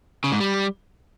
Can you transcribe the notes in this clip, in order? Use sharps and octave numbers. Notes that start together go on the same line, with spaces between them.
C#3
G#2
G3